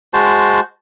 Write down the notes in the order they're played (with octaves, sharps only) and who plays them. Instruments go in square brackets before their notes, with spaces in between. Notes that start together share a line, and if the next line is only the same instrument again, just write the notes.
[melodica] G#3 F#4 C5 A5